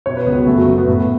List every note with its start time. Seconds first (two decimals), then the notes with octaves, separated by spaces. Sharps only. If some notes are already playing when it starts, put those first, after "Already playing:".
0.06 B2 C#5
0.17 B4
0.26 C#2 B3
0.37 F#3
0.47 F#1 A3
0.58 F#3
0.67 F#1 A3
0.78 B3
0.87 A2 A3